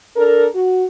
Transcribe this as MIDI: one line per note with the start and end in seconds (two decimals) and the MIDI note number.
0.16 0.46 62
0.16 0.46 69
0.16 0.46 70
0.54 0.84 66